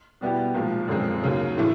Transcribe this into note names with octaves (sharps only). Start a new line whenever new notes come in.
B2 G3 B3 E4 G4
B1 A#2 F3 G#3
F#2 D3 F3 G#3 C4
D#2 C#3 F#3
A2 E3 A3